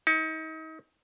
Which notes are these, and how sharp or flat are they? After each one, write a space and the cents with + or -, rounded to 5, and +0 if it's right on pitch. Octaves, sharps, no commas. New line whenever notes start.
D#4 +35